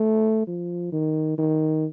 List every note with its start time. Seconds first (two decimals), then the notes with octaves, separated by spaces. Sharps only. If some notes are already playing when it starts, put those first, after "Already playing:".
Already playing: A3
0.47 F3
0.92 D#3
1.38 D#3